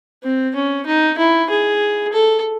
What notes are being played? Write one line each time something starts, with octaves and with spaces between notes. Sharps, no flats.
C4
C#4
D#4
E4
G#4
A4